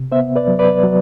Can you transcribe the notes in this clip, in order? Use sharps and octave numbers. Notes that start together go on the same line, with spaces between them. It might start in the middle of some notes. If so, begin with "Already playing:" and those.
Already playing: C3
B3 C5 E5
B4 D5
F#3
B4 D5
F#3